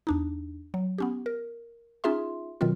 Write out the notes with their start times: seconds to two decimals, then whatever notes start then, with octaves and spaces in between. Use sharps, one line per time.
0.07 E2 D4 D#4
0.74 F#3
0.98 B3 C#4 G4
1.26 A#4
2.04 C#4 D#4 F4 G#4 E5 C6
2.61 B2 D#3 F#3 C4 F4